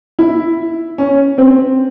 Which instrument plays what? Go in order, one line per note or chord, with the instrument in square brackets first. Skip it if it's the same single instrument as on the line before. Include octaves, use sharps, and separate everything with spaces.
[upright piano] E4
C#4
C4